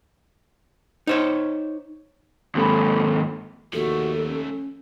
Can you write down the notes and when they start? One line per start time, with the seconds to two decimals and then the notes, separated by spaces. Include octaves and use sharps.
1.07 D#4 C5 C#5
2.55 D#2 G#2 C4 A4 B5
3.73 D#2 F3 A3 F#4 A4
4.27 C#4